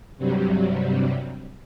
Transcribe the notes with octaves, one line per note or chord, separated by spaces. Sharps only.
G2 C3 F#3 G3